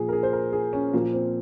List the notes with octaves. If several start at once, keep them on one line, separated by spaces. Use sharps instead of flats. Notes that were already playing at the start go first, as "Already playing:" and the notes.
Already playing: A#2 F3 G#4
A#4
G#4
C5
A#4
G#4
C#4
A#2 F3 A#3
C4